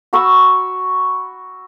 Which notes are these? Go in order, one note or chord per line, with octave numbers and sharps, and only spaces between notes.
F#4 B5 C#6 E6